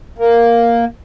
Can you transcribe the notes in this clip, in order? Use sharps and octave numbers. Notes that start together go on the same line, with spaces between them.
A#3